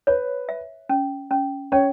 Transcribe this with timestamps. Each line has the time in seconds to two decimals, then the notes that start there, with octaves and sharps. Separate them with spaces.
0.07 B4 C#5
0.49 E5
0.89 C#4
1.31 C#4
1.72 C#4 C#5